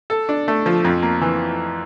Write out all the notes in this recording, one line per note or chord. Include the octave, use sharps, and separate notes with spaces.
A4
D4
A3
F3
F2
A#3
E3